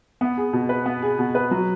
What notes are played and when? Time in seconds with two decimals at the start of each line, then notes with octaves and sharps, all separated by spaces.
0.21 B3
0.37 G#4
0.53 B2
0.69 B4
0.86 B3
1.03 G#4
1.19 B2
1.35 B4
1.51 F#3